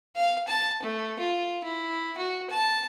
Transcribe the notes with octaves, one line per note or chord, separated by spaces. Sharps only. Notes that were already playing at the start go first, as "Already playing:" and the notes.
F5
A5
A3
F4
E4
F#4
A5